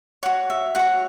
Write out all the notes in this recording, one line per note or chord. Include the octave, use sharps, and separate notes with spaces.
F#4 C#5 F#5
E5
F#4 C#5 F#5